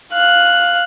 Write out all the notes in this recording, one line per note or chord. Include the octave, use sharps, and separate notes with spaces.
F5 F#6